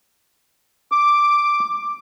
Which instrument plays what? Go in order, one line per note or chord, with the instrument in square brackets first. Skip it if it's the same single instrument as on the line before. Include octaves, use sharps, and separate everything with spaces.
[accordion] D6